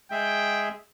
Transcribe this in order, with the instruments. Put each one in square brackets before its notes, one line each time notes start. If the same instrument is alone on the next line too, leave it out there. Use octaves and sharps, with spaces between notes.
[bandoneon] G#3 G#4 E5 [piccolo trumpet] G5